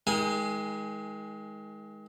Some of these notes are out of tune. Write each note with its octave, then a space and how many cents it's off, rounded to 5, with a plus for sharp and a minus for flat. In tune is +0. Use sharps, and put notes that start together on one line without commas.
D#3 +35 G#3 +10 G#5 +0